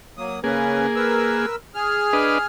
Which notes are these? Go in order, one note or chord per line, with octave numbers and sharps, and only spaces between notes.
F#3 A#3 D#6
C#3 A#3 C#4 G#4 B4
A#4 B4 E6
G#4 F6
D4 B4 D#5